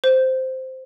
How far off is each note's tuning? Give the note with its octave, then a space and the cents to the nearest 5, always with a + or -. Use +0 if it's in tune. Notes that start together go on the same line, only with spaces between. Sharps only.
C5 -5